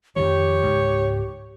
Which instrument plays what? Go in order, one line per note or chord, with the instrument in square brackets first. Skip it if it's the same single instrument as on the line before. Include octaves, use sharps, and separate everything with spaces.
[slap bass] F2 D#3 F3 [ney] G4 [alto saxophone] C#5
[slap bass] C#2 G#2